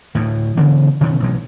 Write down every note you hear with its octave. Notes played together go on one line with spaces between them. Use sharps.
D2 A2
C#3 E3 B3 D4
B2 D#3 C#4
A1 B2 F#3